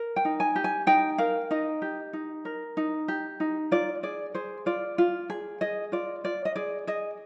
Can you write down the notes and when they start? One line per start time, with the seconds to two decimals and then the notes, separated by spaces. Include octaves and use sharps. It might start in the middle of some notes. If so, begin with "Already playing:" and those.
Already playing: A#4
0.16 G5
0.25 D#4
0.40 G#5
0.56 G4
0.64 G#5
0.87 D#4 G5
1.18 A#4 F5
1.51 D#4 D#5
1.82 G4
2.13 D#4
2.45 A#4
2.77 D#4
3.08 G4
3.40 D#4
3.71 F4 D5
4.03 G#4 D5
4.35 G#4 C5
4.66 F4 D5
4.98 F4
5.30 G#4
5.61 G#4 D#5
5.92 F4 D5
6.24 F4 D5
6.45 D#5
6.56 G#4 D5
6.87 G#4 D#5